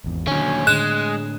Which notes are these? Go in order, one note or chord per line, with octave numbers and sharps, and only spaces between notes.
G#1 E2
D#2 D3 F#3 C#4
A2 D3 G#3 F#6 E7